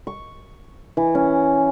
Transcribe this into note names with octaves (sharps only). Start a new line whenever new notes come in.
C#6
E3
C#4